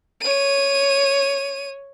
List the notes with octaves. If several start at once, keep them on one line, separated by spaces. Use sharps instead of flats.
C#5 D#7